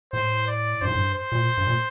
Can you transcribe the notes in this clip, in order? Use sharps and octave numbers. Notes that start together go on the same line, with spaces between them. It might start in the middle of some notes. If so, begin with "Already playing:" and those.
A2 C5
D5
G2 C5
A2
G2
C5
A#2
G2
A#2